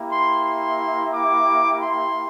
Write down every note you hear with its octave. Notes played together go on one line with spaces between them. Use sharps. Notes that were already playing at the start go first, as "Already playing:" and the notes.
Already playing: A#3 E4 G4
C6
C6
D6
C6